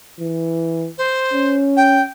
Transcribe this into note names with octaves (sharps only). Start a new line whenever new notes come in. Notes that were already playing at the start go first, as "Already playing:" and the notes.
E3
C5
C#4
G5